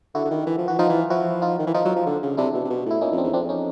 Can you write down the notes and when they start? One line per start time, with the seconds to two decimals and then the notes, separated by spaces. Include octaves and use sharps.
0.14 D3 E4 F#4
0.25 D3
0.30 D#3
0.47 E3
0.57 F3
0.68 E3 F#4
0.78 F3 D#4 F4
0.89 E3
1.10 F3 E4 F#4
1.42 D#4 F4
1.59 D#3
1.67 E3
1.74 F3 D#4 F4
1.85 F#3
1.96 F3
2.06 D3
2.23 C#3
2.37 C3 D4 E4
2.54 B2
2.64 C3
2.70 B2
2.86 A2 E4
3.01 A#2 C#4 D#4
3.12 F2
3.18 C4 D4
3.23 E2
3.33 F2 C4 D4
3.49 C#4 D#4